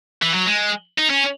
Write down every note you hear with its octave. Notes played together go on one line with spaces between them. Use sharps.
E3
F#3
G#3
D#4
C#4